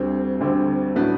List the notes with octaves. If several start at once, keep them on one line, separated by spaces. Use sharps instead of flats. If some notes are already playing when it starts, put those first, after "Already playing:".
Already playing: D2 D3 G3 C4
D2 D3 G3 C4
A2 F#3 B3 D4